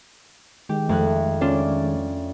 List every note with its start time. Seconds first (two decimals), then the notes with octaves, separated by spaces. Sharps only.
0.69 D#3 G#3 G4
0.89 F2 A3 F#6
1.41 C#4 D4 F4 D5